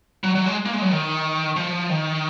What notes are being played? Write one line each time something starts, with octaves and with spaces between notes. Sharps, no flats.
F#3
F#3
G#3
A#3
G#3
F#3
D#3
F3
D#3